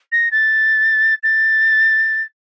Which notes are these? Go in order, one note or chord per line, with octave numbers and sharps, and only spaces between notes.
A#6
A6
A6